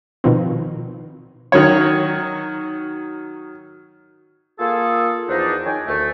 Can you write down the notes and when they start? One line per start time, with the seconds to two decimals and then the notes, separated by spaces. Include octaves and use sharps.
0.24 B2 D#3 F3 C4
1.52 D#3 F#3 C#5
4.59 A#3 F4 G#4 A4
5.28 E2 F3 D4 D#4
5.64 D#3 C#5 G5 G#5
5.87 D2 A3